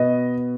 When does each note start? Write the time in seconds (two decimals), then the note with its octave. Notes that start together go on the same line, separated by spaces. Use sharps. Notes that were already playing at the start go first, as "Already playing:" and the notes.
Already playing: B2 B3 D#5